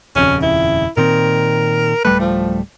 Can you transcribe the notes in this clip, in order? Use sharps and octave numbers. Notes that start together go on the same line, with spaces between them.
D#1 F2 C#3 C#4
E4
A#2 D#3 C4 A#4
D1 G3 A3 B4
F3